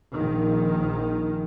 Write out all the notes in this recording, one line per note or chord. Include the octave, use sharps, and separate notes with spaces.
A#1 D#3